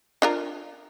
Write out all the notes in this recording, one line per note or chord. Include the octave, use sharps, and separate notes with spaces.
D4 F4 A#4